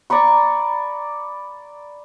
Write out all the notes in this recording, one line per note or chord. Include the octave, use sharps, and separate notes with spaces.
D5 A#5 B5 C#6